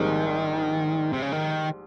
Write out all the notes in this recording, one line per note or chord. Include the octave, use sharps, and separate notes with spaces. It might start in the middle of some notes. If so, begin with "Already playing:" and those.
Already playing: A#1 G#2 D#3 G3 C4
C3
C#3
D#3